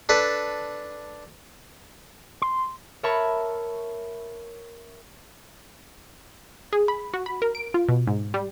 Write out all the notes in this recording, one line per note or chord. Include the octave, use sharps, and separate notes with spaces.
D4 A4 B4
C6
A#4 C#5 E5 A5 B5 C#6
G#4
B5
F#4
B5
A#4
D7
F4
B2
G#2
G3